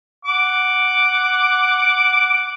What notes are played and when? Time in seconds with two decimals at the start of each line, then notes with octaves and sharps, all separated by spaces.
0.25 F#5 D6